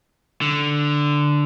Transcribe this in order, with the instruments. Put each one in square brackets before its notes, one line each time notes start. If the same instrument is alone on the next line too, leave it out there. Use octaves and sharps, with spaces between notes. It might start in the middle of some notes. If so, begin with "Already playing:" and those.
[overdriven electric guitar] D3